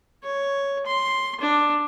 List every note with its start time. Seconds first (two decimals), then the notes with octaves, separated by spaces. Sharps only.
0.23 C#5
0.86 C6
1.40 D4